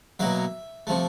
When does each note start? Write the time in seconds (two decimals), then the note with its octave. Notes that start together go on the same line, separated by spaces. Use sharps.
0.19 B2 F#3 A#3 E5
0.87 C3 F3 A3